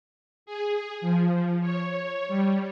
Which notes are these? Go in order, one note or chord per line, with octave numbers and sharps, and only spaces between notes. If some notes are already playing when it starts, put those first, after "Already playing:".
G#4
F3
C#5
G3